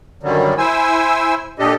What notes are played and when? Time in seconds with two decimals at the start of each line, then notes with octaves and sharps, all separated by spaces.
0.23 F#2 D3 D#3 F#3 G3
0.58 E4 C5 G#5 E6
1.59 A#2 D4 G4 A4 D#5